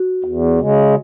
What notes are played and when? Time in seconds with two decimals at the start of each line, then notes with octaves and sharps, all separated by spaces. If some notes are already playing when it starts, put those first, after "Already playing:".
Already playing: F#4
0.24 E2
0.60 C#3 G#3